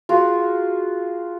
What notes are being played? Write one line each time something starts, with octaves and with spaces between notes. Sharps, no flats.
F4 F#4 G#4 A#4